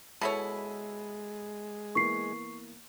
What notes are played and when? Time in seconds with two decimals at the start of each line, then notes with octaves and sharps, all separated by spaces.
0.21 B2 G#3 E4 A4 C#5 B5 D#7
1.95 E3 A#3 B3 C#6 C7